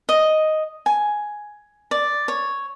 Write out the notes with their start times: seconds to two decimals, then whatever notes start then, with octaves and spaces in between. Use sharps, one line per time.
0.09 D#5
0.86 G#5
1.91 D5
2.28 C#5